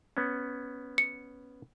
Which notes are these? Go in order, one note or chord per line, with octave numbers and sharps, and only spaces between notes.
B3 C#4
C#7